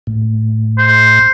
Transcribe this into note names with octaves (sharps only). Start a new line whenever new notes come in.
A2
C5